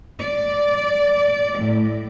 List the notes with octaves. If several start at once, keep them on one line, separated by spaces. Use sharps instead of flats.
D5
A2